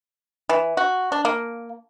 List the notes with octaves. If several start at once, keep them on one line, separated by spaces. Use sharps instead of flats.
E3
F#4
D4
A#3